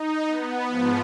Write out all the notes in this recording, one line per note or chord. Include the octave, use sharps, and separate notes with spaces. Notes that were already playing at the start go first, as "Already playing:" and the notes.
Already playing: D#4
B3
G#2 F3